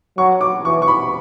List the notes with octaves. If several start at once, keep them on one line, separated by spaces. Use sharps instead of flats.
F#3 C#6
D6
E3 C#6
C#6
B5